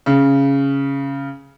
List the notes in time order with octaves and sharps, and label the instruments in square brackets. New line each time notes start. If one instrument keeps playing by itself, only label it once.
[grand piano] C#3